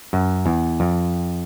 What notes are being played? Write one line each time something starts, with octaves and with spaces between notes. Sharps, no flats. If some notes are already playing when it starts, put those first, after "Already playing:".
F#2
E2
F2